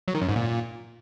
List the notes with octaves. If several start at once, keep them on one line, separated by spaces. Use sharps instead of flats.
F#3
D#3
F#2
G#2
A#2